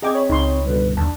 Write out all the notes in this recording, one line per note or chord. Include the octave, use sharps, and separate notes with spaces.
C4 G#4 D#5 G5 A#5 D6 G#6
C#5 B5
C#2 D#4 C6
G2 B2 D3 B4
D#2 D4 A5